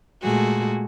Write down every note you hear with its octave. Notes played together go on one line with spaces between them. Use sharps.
A#2 G#3 A3 F#4 G#4